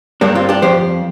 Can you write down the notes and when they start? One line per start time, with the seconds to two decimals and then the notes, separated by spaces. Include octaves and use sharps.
0.21 G2 G3 A#3 D4
0.35 C4 F4
0.49 D4 G4
0.62 F2 F3 G4 C5